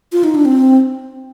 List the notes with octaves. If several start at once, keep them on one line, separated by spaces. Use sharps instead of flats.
F4
D#4
D4
C4